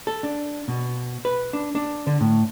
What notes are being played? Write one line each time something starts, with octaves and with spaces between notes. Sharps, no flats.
A4
D4
B2
B4
D4
D4
D3
A2